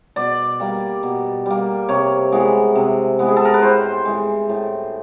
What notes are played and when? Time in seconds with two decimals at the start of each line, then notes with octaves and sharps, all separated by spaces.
0.16 B2 D5
0.60 G3 A#3
1.03 B2
1.46 G3 A#3
1.89 C3 C#5
2.32 E3 G#3 B3
2.75 C3
3.19 E3 G#3 B3
3.28 G#4
3.36 A4
3.45 A#4
3.54 B4
3.62 A2 C5
4.05 E3 G#3
4.49 A2